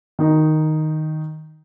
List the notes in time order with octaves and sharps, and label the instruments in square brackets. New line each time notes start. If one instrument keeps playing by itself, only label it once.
[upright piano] D#3 D#4